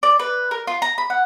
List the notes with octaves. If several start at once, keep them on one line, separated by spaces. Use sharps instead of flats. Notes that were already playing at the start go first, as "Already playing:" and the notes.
D5
B4
A#4
F4
A#5
B5
F#5